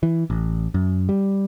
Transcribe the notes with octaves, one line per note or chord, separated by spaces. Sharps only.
E3
A1
F#2
G3